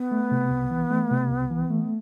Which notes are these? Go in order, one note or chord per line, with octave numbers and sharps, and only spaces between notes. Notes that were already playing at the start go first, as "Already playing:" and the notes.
Already playing: B3
A3
C3
C2
E3
A3
C3
C2
E3
A3